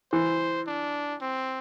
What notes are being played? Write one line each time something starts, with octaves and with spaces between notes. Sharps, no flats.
E3 C5
D4
C4